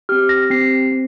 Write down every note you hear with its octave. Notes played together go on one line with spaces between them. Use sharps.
C4 G4 F6
A#6
C4 G4 C7
C4